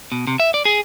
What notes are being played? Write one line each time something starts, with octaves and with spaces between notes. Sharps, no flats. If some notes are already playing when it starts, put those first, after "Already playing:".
B2
C3
E5
D5
G#4